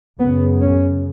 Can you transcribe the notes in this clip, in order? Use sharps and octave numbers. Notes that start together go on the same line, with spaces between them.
F#2 C#3 B3
C#4